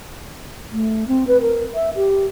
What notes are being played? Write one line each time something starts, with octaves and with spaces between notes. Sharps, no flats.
A3
C4
B4
A#4
E5
G4